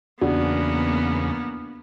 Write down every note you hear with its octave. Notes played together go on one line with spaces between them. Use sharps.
E2 C#3 A#3 B3 D4 F#4